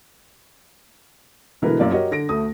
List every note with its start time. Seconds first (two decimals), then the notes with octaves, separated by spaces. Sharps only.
1.62 B2 D3 E3 G#3 A#4 B4
1.79 F#2 A#3 D5 F5
1.92 F#4 G4 A#4 C#5 D#5
2.11 D3 A#6 D7
2.29 D2 A3 D#6